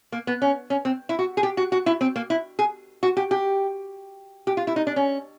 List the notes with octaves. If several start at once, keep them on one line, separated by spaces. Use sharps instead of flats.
A#3
B3
C#4
C#4
C4
E4
F#4
G#4
G4
F#4
F#4
E4
C4
A#3
E4
G#4
F#4
G4
G4
G4
F4
E4
D#4
D4
C#4